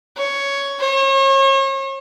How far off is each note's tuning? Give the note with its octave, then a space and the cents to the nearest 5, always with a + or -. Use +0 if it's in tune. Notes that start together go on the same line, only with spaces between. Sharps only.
C#5 +5
C#5 -40